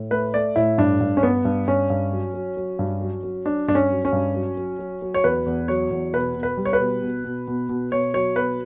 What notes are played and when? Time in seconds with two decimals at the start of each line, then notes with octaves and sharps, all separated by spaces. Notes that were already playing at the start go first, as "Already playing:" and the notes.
Already playing: A2
0.11 A3 B4
0.34 A3 D5
0.56 A2 E4
0.78 G2 D4
1.01 G2
1.17 C#4
1.23 G2 B3
1.45 G2
1.67 G2 C#4
1.90 G2
2.12 F#3
2.34 F#3
2.57 F#3
2.79 G2
3.01 F#3
3.23 F#3
3.46 F#3 D4
3.68 G2 D4
3.75 C#4
3.90 F#3
4.05 C#4
4.12 G2
4.34 F#3
4.57 F#3
4.79 F#3
5.02 F#3
5.14 C#5
5.24 E2 B4
5.46 E2
5.68 F#3 C#5
5.90 E2
6.13 B2 B4
6.35 B2
6.43 B4
6.57 G3
6.65 C#5
6.73 B4
6.80 B2
7.02 B2
7.25 B2
7.48 B2
7.69 B2
7.92 B2 C#5
8.14 F#3 C#5
8.36 B2 B4